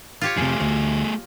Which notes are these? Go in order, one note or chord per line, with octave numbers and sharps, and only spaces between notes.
F4 G4 C#5
F2 C3 A3 G#4
D2